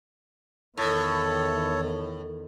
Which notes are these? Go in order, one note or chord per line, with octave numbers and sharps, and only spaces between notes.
E2 A2 D#3 A4 C#5